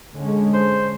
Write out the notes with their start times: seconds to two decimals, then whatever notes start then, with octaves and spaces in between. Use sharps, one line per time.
0.15 D3 G#3 C#4
0.54 C5